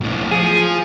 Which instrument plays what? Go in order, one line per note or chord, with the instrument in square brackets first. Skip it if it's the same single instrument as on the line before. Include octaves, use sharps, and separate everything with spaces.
[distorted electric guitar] B1 A2
[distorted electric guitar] F3 [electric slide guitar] G#4